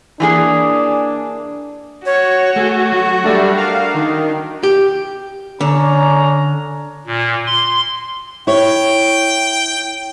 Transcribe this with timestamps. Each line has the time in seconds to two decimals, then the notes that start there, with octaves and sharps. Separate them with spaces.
0.20 E3 A#3 D4 G#4
2.06 F#4 C#5
2.56 A3 G#4
2.92 F#3 C#6
3.24 G3 A3 D4 A4
3.57 A#4 F5
3.94 D#3
4.63 G4
5.61 D3 C#4 D4 A#5
7.07 A#2
7.47 C6
8.47 E4 C#5 G5